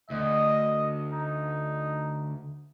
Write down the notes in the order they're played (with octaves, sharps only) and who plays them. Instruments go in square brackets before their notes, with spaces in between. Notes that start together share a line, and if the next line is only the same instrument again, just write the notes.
[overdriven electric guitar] D2 [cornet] D#5
[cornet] D#4